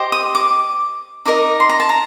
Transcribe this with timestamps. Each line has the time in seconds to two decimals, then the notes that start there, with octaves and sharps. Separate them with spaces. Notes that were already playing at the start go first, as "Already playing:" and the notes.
Already playing: G4 C5 D#5
0.12 D#6
0.35 D6
1.25 D#4 A#4 D#5 D6
1.60 C6
1.69 A#5
1.80 A5
1.89 A#5